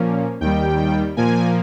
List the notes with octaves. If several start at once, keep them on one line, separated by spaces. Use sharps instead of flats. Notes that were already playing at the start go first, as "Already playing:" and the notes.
Already playing: A#2 F3 A#3 C#4
D#2 D#3 G3 G5
A#2 F3 A#3 G#5